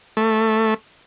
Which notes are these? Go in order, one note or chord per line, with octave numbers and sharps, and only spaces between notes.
A3